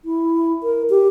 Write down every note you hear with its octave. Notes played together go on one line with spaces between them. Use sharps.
E4
A#4
G4